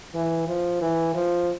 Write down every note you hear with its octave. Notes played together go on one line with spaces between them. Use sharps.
E3
F3
E3
F3